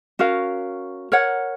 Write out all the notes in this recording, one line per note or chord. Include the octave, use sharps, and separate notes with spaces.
C#4 F#4 A#4 F5
A#4 C#5 F#5